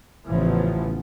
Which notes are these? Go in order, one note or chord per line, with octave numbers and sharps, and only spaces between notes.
A1 C#3 E3 F3 B3